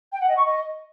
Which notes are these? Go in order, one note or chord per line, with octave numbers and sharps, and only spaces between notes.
G5
F#5
D#5
C#6
D#5